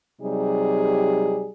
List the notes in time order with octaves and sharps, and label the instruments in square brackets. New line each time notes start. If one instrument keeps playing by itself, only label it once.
[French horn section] C3 F#3 G3 D#4 G4 G#4